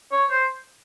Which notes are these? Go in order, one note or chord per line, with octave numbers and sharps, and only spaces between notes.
C#5
C5